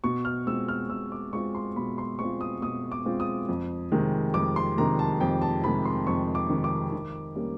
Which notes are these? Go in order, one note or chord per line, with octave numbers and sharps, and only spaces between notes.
B2 C#6
F6
G#3 C4 F4 E6
F6
B2 E6
D6
G#3 C4 F4 C#6
C6
B2 B5
C6
G#3 C4 F4 C#6
D#6
B2 D#6
D6
G#3 C4 F4
D#6
F2
C3 D#3 G#3
F2 D6
C6
C3 D#3 G#3 A#5
A5
F2 G5
A5
C3 D#3 G#3 B5
C6
F2 C#6
D6
C3 D#3 G#3
D6
D#3
G3 A#3 C#4